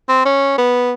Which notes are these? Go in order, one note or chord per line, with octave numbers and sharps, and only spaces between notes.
C4
C#4
B3